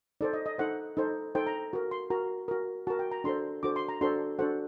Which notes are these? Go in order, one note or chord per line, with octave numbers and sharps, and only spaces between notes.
D#4 A4 C5 D5
D#5
D#5
D#4 A4 C5 F#5
D#4 A4 C5
D#4 A4 C5 G5
A#5
F#4 A#4
C6
F#4 A#4 A#5
F#4 A#4
F#4 A#4 A5
G5
A#5
D4 F#4 A4 C5 C6
D4 F#4 A4 C5 D6
C6
A#5
D4 F#4 A4 C5 C6
D4 F#4 A4 C5 F#5